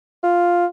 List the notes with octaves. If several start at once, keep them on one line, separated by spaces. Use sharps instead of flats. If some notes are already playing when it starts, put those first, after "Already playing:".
F4